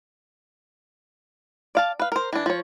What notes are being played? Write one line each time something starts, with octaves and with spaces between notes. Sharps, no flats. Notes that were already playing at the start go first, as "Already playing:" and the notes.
D5 F5 A5
B4 F5
A#4 C5
E3 D4
F3 C#5